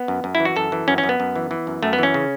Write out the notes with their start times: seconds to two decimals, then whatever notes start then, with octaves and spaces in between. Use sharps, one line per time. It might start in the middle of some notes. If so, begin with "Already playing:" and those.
Already playing: B3
0.08 F#2
0.24 F#2
0.35 E4
0.40 E3
0.45 F#4
0.56 F#2 A4
0.72 E3
0.88 F#2 C#4
0.98 C#4
1.04 F#2
1.09 B3
1.20 F#2
1.36 E3
1.51 E3
1.67 F#2
1.83 F#2 A3
1.93 B3
1.99 E3 C#4
2.14 C#3